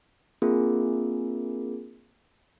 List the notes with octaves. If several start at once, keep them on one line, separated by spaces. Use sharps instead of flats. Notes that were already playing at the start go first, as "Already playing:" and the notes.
A#3 C4 D4 F4 G#4 A#4